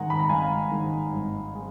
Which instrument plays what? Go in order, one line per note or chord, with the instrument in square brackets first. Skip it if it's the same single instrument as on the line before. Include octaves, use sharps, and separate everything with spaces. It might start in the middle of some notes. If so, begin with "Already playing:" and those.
Already playing: [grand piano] G#2 D#3 G#3 F#5 G#5 A#5
B5
A#5
G#1 F5 G#5
G#2 D#3 G#3
G#1
G#3